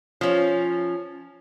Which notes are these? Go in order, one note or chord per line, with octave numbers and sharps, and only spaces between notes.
F3 C#4